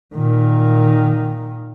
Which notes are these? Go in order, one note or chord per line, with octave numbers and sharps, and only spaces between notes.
A#2 D#3